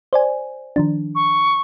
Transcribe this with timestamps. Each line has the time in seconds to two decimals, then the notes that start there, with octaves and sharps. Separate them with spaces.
0.13 C5 D5 G#5
0.76 D#3 F3 D4
1.15 C#6